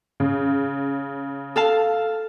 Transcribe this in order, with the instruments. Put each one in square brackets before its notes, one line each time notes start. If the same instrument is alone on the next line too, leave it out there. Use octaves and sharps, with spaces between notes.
[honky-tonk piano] C#3
[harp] A4 F5 A5